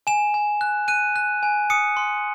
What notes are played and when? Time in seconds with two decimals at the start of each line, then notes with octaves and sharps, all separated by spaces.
0.07 G#5 E7
0.34 G#5
0.61 F#6
0.88 F#6 D#7
1.16 F#6
1.43 G#5
1.70 D#6 C#7
1.97 C6